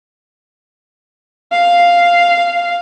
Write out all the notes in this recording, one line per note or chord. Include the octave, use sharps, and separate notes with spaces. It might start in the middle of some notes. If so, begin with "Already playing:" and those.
F5